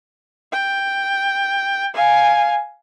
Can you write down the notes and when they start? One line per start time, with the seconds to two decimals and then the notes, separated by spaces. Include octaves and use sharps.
0.52 G5
1.94 F5 G#5